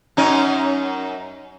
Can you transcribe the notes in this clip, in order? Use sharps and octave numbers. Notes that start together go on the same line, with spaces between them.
F#2 C#4 D#4